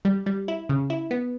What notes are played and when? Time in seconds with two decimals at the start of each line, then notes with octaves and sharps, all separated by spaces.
0.05 G3
0.26 G3
0.48 E4
0.69 C#3
0.90 E4
1.11 B3